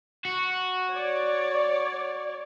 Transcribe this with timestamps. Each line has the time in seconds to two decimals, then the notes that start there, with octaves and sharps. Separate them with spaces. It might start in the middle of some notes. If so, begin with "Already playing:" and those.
0.25 F#4
0.90 C#5 D5